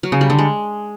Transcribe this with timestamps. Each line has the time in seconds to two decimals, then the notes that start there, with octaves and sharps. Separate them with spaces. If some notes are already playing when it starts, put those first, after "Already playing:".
0.03 F#3
0.12 C#3
0.21 G3
0.30 D3
0.38 G#3